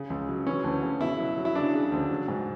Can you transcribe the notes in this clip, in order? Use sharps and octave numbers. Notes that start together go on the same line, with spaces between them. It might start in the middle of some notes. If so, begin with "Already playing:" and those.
Already playing: C#3
C#2
F#3
E3 C#4
D2
C#3
B2 E4
F#3
F#3
E4
C#3 D4
C#3
D2
F#3
G#2